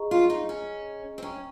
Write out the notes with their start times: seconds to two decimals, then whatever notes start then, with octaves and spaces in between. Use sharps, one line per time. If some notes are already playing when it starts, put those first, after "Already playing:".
Already playing: G#4 D#5 A#5 C#6
0.11 F4
0.30 D#4
0.49 C#4
1.18 C4
1.22 C#4 C#5 G5 A#5 C#6